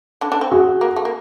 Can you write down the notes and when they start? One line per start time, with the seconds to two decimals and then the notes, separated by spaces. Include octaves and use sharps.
0.21 D3 D4
0.32 D3 D4
0.41 C4
0.51 F#4 G#4
0.81 A#3
0.96 A3
1.05 A#3